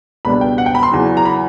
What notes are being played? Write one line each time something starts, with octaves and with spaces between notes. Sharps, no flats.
C#2 B2 G3 B3 D4 B5
G5
F#5
G5
B5
C6
E2 C#3 F#3
A#5
B5